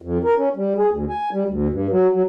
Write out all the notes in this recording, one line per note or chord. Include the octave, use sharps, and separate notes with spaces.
F2
A#4
C#4
G3
G#4
D2
G#5
G3
D2
G2
F#3
F#3